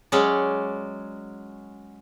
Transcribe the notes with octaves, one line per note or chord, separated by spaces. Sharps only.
F#3 G#3 C#4 D5